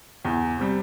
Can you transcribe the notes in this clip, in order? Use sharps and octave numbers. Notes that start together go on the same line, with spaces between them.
E2
C3 G3